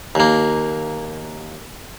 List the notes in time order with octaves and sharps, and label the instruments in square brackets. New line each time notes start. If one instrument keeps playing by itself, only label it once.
[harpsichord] D#2 A#3